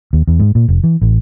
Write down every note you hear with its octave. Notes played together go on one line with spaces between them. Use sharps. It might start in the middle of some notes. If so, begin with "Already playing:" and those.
D#2
E2
G#2
A#2
F1
E3
A1